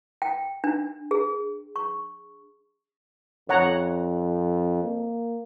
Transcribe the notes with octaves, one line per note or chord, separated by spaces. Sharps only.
G5
D4
G#4
C#6
F2 C#5 F#5 A#5
A#3